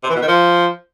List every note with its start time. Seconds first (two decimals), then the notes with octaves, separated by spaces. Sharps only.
0.03 C3
0.09 E3
0.16 B2
0.22 D#3
0.28 F3